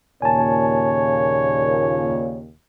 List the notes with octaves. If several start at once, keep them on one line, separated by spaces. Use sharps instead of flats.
D#2 A#2 C#3 C#5 G#5 A5